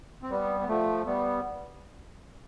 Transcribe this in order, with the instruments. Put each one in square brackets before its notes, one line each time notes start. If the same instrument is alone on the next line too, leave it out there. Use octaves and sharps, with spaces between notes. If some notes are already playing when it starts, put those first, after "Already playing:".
[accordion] C4
G3 B3
B3
F3 A3
G3 B3